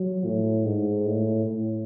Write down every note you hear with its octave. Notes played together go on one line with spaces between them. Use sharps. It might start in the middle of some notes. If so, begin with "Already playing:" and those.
Already playing: F#3
A2
G#2
A2
A2